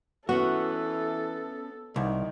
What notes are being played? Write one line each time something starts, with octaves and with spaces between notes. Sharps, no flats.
E3 B3 C#4 F#4 A4
C2 D#3